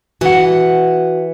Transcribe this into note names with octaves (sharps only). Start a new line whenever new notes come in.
E3 F#4 F#5